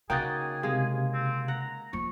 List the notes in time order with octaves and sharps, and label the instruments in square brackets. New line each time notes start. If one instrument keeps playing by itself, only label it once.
[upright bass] C#3 [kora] A#3 D#4 F#4 [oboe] G#4 [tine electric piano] G5 A6
[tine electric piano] C3 F5 G#6 [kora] G#3
[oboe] C4
[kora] F#5 [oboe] A#5
[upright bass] F3 A#3 [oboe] C#6